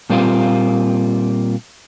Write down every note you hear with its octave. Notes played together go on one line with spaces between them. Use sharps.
A#2 G3 A#3 C4 F4